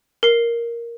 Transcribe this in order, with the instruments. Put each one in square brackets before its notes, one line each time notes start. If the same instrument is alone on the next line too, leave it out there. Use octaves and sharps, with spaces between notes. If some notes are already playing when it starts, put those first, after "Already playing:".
[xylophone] A#4 C7